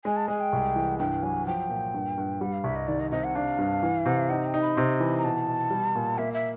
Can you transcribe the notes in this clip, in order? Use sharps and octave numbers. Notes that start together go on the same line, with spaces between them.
G#3 G#5
A5
G#3 G#5
G5
C2
E3
G2 G5
F#3 G#5
F3 G5
A#2
G2
G2
G3 F#5
F5
C2 E5
D#5
D#3 D5
D#5
C3 D#5
F#5
D4 F5
G2
E3
C3
D#4 F#5
G5
D#4
B5
C3 C6
E3 B5
A#5
B2 A5
B2
G3
A#2
A#3 E5
E5